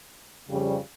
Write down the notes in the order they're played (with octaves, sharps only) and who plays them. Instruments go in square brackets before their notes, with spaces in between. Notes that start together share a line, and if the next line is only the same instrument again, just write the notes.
[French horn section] F2 C#3 G3